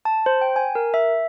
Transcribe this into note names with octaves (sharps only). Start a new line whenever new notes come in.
A5
C5
G5
G#5
A#4
E5